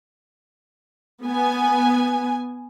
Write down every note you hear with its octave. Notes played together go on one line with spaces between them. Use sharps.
B3 G#5